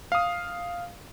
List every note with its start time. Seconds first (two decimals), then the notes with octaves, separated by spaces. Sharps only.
0.12 F5 D#6